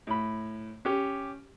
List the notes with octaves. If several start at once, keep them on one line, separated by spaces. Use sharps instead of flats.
A2 B5
C#4 G4